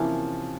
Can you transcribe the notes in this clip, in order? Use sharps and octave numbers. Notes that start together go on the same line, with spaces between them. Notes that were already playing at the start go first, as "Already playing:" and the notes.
Already playing: C3 E3 F3 A#3 C#4